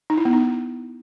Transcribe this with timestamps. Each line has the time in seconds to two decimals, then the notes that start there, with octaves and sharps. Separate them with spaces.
0.10 D#4
0.18 E4
0.25 B3
0.33 D#4